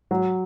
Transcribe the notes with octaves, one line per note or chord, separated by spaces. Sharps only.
F#3